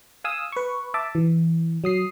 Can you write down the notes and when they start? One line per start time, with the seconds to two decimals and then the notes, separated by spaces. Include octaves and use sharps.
0.24 F5 G#5 D#6 E6
0.52 B4 C#6
0.94 E5 A5 D6
1.15 E3
1.84 F#3 D#6 C7